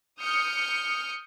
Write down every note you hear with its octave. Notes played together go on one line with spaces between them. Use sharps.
D#6 F6 G6 C#7